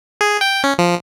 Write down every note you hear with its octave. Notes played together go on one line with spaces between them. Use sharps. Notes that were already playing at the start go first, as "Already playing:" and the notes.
G#4
G5
C#4
F3